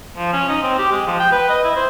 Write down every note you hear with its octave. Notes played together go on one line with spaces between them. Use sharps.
F3
C#4
D#4
C4
G4
G#3
F3
G5
B4
D#5
E4
C5